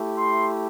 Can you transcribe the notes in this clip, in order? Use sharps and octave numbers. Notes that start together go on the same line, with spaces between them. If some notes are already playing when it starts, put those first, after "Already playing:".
Already playing: A3 E4 G4
C6